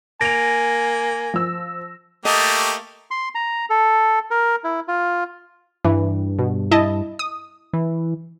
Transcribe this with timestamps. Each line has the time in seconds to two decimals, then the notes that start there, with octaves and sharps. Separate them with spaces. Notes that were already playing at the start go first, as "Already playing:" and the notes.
0.21 A#3 G#5 A#6 D7 F7
1.34 F3 E6
2.25 A3 A#3 G4 D#5 A5
3.11 C6
3.35 A#5
3.70 A4
4.31 A#4
4.64 E4
4.88 F4
5.85 G2 E3
6.39 B2
6.71 E4 D#5 A5
7.19 D#6
7.73 E3